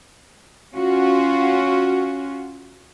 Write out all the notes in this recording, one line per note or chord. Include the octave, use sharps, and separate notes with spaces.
C#4 F4 F#4